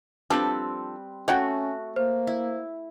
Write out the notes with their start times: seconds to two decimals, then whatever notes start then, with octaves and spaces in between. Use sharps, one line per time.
0.30 F3 G3 C4 D4 A4 B4
1.28 A3 C#4 F#4 C#5 F#5 G5
1.96 A#3 C5
2.27 E4